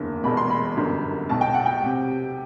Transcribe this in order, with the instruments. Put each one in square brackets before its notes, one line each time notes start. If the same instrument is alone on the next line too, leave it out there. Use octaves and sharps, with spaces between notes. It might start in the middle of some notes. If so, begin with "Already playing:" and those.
Already playing: [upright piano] F#1 E2 D3
E1 E2 B2 B5
C6
B5
G1 F#2 D3
B1 B2 A5
G5
F#5
G5
C3